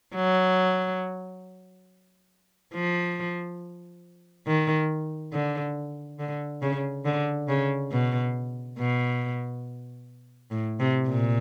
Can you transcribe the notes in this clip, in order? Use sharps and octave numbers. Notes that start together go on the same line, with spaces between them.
F#3
F3
D#3
D3
D3
C#3
D3
C#3
B2
B2
A2
C3
A#2